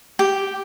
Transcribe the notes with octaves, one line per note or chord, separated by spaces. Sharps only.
G4